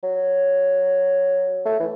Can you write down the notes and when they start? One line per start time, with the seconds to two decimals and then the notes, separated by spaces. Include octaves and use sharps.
0.03 F#3
1.66 A3
1.80 E3